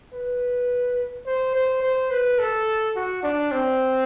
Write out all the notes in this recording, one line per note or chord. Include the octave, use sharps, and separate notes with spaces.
B4
C5
C5
C5
B4
A4
F#4
D4
C4